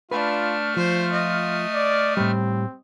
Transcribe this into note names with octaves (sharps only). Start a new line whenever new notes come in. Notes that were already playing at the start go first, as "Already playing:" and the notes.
A3 D4 F4 B4 F6
F3 F4 C5
D#5
D5
A2 G3 C4